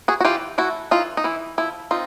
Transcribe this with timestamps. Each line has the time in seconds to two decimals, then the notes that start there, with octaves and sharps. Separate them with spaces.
0.08 F#4 G#4
0.20 F#4
0.24 E3 F4 G4
0.58 A3 E4 F#4
0.91 E3 D#4 F4
1.17 D#4
1.24 E3 E4
1.58 F3 E4
1.91 C4 D#4 F4